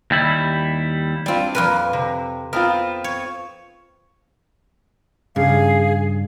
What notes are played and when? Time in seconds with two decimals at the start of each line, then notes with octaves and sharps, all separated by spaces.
0.11 D#2 G3 E4
1.26 G3 C4 D4 F4
1.55 F2 A#2 A#4 B4
1.93 C3
2.53 B3 C4 F4 A#4
3.04 C#5
5.36 G2 C#3 G#4 F5